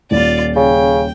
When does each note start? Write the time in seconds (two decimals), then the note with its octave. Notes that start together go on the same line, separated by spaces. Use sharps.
0.11 D#1 F4 D5
0.56 C#3 G5